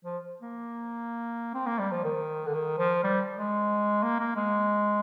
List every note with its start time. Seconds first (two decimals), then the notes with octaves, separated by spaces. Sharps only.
0.05 F3
0.42 A#3
1.54 C4
1.66 A#3
1.79 G3
1.91 F3
2.04 D#3
2.46 D3
2.54 D#3
2.78 F3
3.03 G3
3.37 G#3
4.03 A#3
4.20 A#3
4.36 G#3